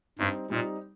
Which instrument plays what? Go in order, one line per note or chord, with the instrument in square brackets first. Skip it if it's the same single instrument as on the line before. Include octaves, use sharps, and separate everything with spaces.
[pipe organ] G2 [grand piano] G3 C4 D#4
[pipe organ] A#2 [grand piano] G3 C4 D#4